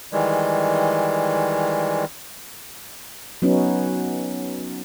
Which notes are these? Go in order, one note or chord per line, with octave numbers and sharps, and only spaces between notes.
D#3 E3 G3 G#3
F#3 B3 C#4 D#4